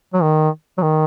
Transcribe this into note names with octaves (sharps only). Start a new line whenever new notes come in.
F#3
D#3
F#3
D#3